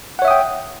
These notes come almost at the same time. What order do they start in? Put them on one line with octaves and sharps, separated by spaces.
F#5 C#5 E5 D#6 G5